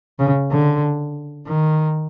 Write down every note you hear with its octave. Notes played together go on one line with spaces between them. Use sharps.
C#3
D3
D#3